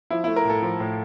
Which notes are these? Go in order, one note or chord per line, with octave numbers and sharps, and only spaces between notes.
F3 E4
A3 E4
A#4
A2
A4
F3
A2